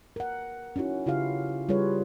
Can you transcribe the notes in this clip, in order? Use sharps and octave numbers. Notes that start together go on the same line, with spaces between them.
A#4 F#5
C#4 D#4 E4 F#4
C#3 E4 F4 G4 F5
G3 F4 G#4 B4 C#5